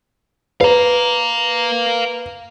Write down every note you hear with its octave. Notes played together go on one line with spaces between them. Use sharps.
B4 F5 A#5